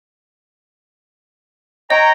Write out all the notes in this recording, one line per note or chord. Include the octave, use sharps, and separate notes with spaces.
C#5 D#5 G5 A#5